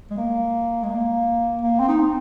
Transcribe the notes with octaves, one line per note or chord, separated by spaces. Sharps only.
G#3
A#3
G#3
A#3
A#3
C4
D#4
C4